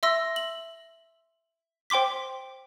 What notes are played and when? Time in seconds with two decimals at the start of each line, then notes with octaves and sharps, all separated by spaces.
0.03 E5 C6 E6 A#6
0.36 F#7
1.90 C5 G5 C6 D6 B6